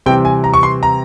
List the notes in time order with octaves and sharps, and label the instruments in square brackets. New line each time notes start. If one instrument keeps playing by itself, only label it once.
[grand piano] C3 E3 G3 C4 G5
G#5
A#5
C#6
C6
A#5